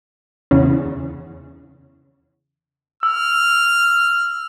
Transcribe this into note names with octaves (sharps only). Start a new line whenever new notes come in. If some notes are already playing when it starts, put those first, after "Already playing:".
E2 C#3
E6 F6